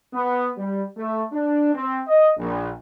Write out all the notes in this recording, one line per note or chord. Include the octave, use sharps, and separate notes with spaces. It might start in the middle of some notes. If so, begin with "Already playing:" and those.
B3
G3
A3
D4
C4
D#5
A#1